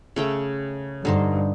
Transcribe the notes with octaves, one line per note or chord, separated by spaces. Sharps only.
C#3 A3 G5
G2 D3 D#4 C5